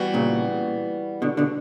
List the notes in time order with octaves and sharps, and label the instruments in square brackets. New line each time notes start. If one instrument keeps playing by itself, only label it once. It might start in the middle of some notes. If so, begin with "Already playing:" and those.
Already playing: [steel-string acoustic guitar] E3 G3 B3 F#4
[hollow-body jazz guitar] A#2 C#3
B2 D3
B2 D3